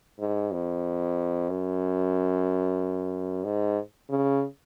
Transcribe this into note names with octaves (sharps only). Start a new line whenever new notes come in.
G#2
F2
F#2
G#2
C#3